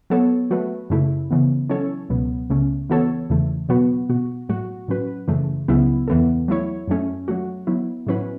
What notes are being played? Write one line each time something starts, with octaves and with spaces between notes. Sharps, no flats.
F#3 B3 A4 C#5
F#3 A3 F#4 B4
F#2 C#3 A3 E4
C#3 E3 B3
F#3 C#4 E4 A4 C#5
C#2 B2 F#3 B3
C#2 C#3 A3 C#4
E3 B3 F#4 A4 C#5
E2 C#3 E3 A3
B2 F#3 B3 F#4 B4
B2 B3 F#4
A2 F#3 A3 F#4
A2 F#3 C#4 F#4 B4
F#2 C#3 E3 A3
C#2 C#3 F#3 B3 E4
E2 E3 B3 A4
F#3 A3 E4 C#5
F#2 F#3 A3 C#4
F#3 A3 F#4
F#3 B3 E4
A2 F#3 C#4 E4 B4